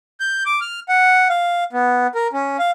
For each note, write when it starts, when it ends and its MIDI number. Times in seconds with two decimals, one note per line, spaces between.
0.20 0.43 91
0.46 0.60 86
0.61 0.80 89
0.89 1.28 78
1.30 1.64 77
1.73 2.07 59
2.15 2.28 70
2.33 2.57 61
2.59 2.71 77